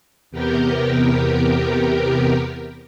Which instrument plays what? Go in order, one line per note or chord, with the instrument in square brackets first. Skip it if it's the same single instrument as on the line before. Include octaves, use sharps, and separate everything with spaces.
[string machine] E2 C3 B3 G4 A#4 G5